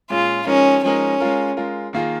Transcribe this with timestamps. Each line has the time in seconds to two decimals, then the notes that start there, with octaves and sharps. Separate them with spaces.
0.10 A#2 G#3 C#4 F4 G#4
0.47 F3 G#3 C#4 D#4 A#4
0.83 F3 G#3 C#4 D#4 A#4
1.20 G#3 F4 A#4
1.57 G#3 F4 A#4
1.93 D#3 A#3 F4 G#4